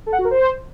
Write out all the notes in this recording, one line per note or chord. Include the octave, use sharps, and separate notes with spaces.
A4
F#5
F#4
A#4
C5